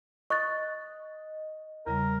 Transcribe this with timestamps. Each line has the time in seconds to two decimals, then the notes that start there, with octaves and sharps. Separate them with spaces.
0.30 D#5 C#6 F#6 A6
1.87 E2 C#3 G3 A#4